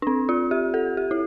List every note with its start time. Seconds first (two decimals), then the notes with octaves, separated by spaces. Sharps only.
0.02 D4
0.07 C4
0.29 F4
0.51 G4
0.74 A4
0.97 G4
1.11 E4